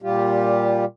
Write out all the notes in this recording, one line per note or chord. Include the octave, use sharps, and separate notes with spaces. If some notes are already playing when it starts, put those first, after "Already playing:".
A#2 G3 F4 G4